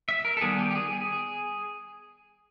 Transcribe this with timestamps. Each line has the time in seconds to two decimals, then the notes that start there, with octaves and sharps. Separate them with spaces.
0.09 E5
0.25 A#4
0.37 A4
0.41 D#3 G3 B3 G#4
0.59 G4
0.71 G4
0.75 G#4
0.92 G#4